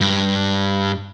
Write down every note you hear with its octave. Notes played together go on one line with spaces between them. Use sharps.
G2